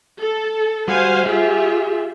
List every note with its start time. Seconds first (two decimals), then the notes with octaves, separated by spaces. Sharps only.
0.20 A4
0.88 G3 F#4 C5 F5 G#5
1.26 F4 G4 G#4 E5